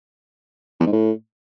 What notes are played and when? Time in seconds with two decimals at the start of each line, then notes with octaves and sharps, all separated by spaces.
0.80 E2
0.86 G#2
0.93 A2